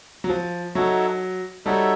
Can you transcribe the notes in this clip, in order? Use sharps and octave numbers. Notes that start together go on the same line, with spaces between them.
F#3
F3
F#3 D#4 F#4 A4 C#5 E5
G3 D#4 F#4 A4 C#5 E5